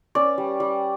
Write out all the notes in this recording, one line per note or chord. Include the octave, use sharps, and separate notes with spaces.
C#4 D5
G3
G3